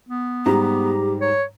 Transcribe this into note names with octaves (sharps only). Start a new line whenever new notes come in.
B3
G#2 G3 G4 A#5
C#5